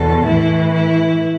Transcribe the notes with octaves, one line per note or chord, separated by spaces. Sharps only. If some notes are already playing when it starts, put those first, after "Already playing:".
Already playing: E2 B2 A4
A2 E3 E4
E4